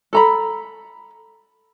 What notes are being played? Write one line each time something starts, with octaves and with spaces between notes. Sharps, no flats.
A4 A#5 B5